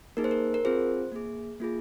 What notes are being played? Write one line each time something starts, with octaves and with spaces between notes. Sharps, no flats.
A#3 D#4 G#4 A#4
C5
A#4
A#4
C4 F4 G#4 C5
A#3 G#4
A#3 F4 G#4